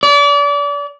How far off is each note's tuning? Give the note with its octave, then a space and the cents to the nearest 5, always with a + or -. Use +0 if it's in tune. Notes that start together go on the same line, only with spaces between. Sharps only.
D5 -35